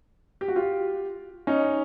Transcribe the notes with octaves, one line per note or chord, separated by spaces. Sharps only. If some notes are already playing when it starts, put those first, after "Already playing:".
G4
F#4
F4 G4
C#4 D#4